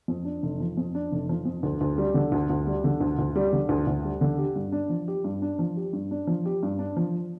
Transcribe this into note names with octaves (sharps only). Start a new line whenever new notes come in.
F2
D4
F1
F3
F2
D4
F1
F3
F2
D2
D2
G3
D3
D2
D2
G3
D3
D2
D2
G3
D3
D2
D2
G3
D3
G4
G2
D4
F3
G4
G2
D4
F3
G4
G2
D4
F3
G4
G2
D4
F3